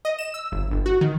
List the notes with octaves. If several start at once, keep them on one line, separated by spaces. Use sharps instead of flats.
D#5
E7
E6
G1
G1
F#4
D#3